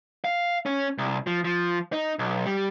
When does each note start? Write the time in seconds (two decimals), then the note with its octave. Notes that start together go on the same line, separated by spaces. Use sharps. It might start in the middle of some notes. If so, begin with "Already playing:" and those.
0.25 F5
0.66 C#4
0.98 C2
1.27 F3
1.45 F3
1.93 D#4
2.19 B1
2.46 G3